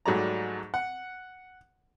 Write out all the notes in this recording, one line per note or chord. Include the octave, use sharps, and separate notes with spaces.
G#2 F#3 G3 A3 D5 A#5
F#5